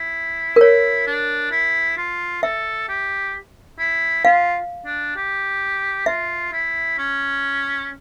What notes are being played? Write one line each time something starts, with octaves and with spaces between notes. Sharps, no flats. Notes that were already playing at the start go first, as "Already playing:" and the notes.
Already playing: E4
A#4
E4 C#5
D4
E4
F4
A4 E5
G4
E4
F4 F5
D4
G4
F4 E5
E4
C#4